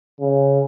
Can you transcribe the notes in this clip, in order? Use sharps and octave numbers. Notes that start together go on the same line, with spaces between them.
C#3